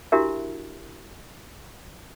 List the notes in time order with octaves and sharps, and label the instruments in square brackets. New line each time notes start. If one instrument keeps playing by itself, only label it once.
[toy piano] D4 E4 F#4 G4 A#4 E5